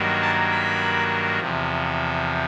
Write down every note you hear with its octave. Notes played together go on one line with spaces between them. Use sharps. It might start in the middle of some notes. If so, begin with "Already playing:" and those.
Already playing: G2 D#3 F#3 A#3
A5
B5
E2 C3 F3